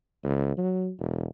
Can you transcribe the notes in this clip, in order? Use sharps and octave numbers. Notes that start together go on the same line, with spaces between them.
C#2
F#3
E1